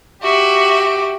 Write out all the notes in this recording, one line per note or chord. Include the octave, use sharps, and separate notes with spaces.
F#4 G4 E5 D6